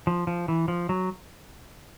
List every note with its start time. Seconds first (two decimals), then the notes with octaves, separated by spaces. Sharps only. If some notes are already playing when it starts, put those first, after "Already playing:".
0.07 F3
0.27 F3
0.48 E3
0.68 F3
0.89 F#3